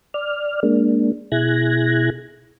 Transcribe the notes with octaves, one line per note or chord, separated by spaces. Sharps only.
D5 F6
G#3 A#3 D4
B2 E4 G#4 F#6 G#6 A#6